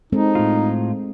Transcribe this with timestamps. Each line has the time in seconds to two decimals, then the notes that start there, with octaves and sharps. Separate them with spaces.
0.12 G#3 C4 D#4 A4
0.35 A2 F4